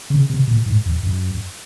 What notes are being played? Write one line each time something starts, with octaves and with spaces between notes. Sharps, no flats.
C#3
C3
A#2
G#2
F2
F#2